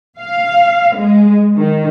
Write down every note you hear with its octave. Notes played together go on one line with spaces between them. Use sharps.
F5
G#3
D#3